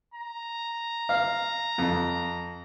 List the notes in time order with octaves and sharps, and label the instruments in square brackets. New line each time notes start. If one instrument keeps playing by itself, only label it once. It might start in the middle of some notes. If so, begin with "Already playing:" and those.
[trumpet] A#5
[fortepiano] F5
F2